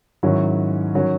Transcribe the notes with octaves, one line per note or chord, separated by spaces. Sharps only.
G#2 D#3 F#3 C#4 E4
D#3 F#3 C#4